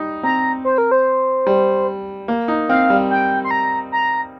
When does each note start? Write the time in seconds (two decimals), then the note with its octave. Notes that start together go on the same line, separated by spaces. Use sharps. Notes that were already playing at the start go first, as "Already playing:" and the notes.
Already playing: G3 D#4
0.23 C4 A#5
0.65 C5
0.78 A#4
0.91 C5
1.47 G3
2.28 A#3
2.48 D#4
2.69 C4 F5
2.90 G3
3.10 G5
3.44 C6
3.51 A#5
3.92 A#5